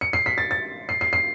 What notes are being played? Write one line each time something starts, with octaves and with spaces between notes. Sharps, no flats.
C#7
C7
B6
A6
A6
C7
C7
C7